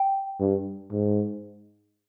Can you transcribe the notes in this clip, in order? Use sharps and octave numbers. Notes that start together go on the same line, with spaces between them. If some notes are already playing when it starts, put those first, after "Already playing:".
Already playing: G5
G2
G#2